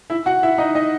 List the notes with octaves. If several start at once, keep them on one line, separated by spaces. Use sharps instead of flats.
E4 E5
F#4 F#5
E4 E5
D#4 D#5
D#4 D#5